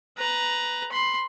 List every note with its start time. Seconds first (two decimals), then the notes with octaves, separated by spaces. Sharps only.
0.18 B4 A#5
0.92 B5 C6